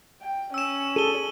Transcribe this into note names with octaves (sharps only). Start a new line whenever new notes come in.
G5
C#4 E6 E7
G#4 A4 D#7 G7